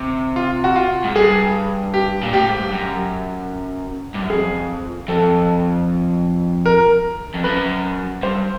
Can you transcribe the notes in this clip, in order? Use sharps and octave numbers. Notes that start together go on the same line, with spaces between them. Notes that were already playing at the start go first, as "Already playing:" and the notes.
Already playing: C3
F4
F#4
F4
G#2
G2 G#4
G4
A#2
A2 G4
G#2
G2
F#2
G2
F#2
F2 G#4
F2 A4
A#4
F2
F#2 B4
G2 C5